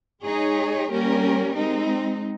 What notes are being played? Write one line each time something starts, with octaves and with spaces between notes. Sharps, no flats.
G#3 D#4 G#4 C#5
G3 A#3 C#4 G4 A#4
G#3 C4 D#4